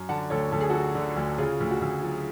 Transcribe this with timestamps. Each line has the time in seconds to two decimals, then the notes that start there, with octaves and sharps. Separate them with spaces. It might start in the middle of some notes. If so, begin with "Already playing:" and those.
Already playing: F#2
0.09 D3 F#5 A5
0.30 D2 A4 C#5
0.52 D2 A4
0.60 G#4
0.70 F#3 F#4 A4
0.95 D3
1.16 D2
1.38 C#3 F4 G#4
1.60 D2
1.71 F#4
1.81 D2
2.03 F#3 F4